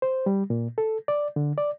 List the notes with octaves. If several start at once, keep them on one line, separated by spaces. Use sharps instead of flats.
C5
G3
A#2
A4
D5
D3
D5